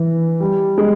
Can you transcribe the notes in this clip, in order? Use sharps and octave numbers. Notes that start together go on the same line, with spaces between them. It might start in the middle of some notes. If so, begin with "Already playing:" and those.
Already playing: E3
G3
G#3